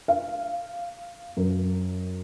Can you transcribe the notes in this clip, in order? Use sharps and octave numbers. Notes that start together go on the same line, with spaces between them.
F5
F#2